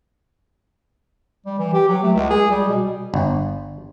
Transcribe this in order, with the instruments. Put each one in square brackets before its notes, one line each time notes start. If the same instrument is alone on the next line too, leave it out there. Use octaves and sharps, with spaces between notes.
[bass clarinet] G3
E3
G4
F#3
A3
C#2
G#4
G3
B2
[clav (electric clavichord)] G1